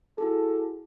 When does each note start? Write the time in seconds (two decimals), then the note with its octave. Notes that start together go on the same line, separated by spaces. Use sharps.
0.18 E4 F#4 G#4 A4